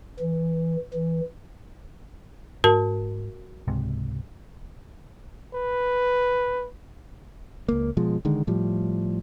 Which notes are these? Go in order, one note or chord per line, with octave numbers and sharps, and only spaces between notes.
E3
E3
G#2 F#4 A#4 A5
C#2 G#2 C3
B4
C#2 A#3
B2 F3 G#3
D3 D#3 G#3
A2 F3 G3